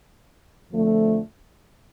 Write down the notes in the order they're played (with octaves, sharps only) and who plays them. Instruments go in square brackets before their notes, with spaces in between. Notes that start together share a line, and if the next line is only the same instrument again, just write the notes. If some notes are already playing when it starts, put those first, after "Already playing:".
[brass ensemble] F2 D3 F3 A3